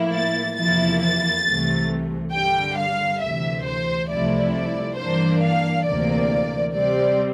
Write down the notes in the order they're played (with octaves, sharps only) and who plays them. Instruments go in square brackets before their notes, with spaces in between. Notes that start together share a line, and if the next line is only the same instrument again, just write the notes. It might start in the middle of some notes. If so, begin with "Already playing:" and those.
Already playing: [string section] A2 F3 A#3 E4
A6
E2 C3 F3 A#3 E4 A6
A6
C2 C3 E3 A3
G2 D3 G3 G5
F5
D2 C3 E3 E5
C5
C2 C3 F3 A3 E4 D5
D5
G2 E3 A#3 D4 C5
F5
D2 C3 E3 A#3 D5
C3 G3 C4 D5